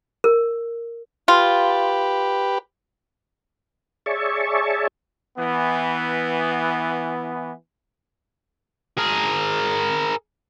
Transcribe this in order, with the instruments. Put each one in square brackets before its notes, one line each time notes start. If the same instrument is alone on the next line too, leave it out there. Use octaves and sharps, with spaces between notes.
[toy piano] A#4
[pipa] F4 [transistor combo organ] G4 B4
[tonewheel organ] G#4 C#5 D5 E5 A5 C#6
[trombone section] E3 B3
[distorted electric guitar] G#4 A#4